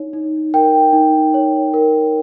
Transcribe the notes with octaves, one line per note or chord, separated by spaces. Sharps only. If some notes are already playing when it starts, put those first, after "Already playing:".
Already playing: D#4 C#5
D#4
A#4 G5
D#4
C#5
A#4